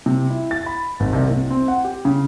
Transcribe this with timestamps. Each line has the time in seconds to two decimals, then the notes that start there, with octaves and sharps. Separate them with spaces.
0.06 C3
0.30 E4
0.51 A6
0.66 B5
1.00 G#1
1.13 C2
1.31 C3
1.51 C4
1.68 F#5
1.84 G4
2.05 C#3